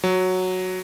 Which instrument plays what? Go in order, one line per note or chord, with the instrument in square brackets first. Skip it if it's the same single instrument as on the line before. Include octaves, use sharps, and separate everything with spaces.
[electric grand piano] F#3